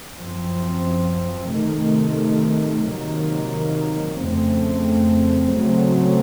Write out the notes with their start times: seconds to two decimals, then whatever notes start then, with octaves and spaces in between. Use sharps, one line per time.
0.17 F#2 F3 C4
1.51 C3 D#3 A3
2.86 C3 D#3 F#3 A#3
4.21 F2 C#3 A3 C4
5.55 C#3 F#3 A3 C4